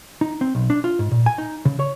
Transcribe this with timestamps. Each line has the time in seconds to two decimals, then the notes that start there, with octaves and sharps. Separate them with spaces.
0.21 D#4
0.41 C4
0.55 B1
0.70 D4
0.84 F4
0.99 G#2
1.12 A#2
1.26 G#5
1.38 D#4
1.65 C#3
1.79 C#5